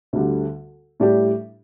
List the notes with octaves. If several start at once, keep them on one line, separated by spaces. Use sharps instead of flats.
D2 D3 G3
A2 G3 D4 G4